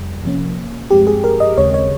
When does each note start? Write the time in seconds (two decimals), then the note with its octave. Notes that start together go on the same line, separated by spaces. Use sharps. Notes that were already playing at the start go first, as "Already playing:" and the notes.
Already playing: F2 C3 G3
0.24 C3 F3 A#3 C#4
0.91 G2 F3 G#3 C4 G4
1.07 G#4
1.24 A#4
1.40 D#5
1.57 D#2 C#3 G#3 C4 C#5
1.74 C#5